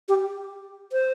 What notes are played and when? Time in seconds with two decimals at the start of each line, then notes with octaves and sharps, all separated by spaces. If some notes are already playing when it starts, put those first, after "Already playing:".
0.09 G4
0.92 C5